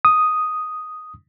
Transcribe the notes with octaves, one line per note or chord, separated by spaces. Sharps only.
D#6